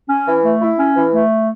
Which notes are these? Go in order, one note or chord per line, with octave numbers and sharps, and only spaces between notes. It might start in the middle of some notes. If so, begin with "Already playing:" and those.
C#4
E3
A3
E4
C#4
E3
A3